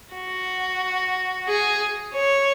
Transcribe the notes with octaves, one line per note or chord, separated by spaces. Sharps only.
F#4
G#4
C#5